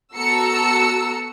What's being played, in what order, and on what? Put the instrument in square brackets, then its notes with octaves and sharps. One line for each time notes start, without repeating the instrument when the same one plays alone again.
[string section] B3 F#4 A4 A#5 E6 C#7